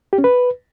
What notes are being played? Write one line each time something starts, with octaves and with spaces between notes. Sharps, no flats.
G4
C#4
B4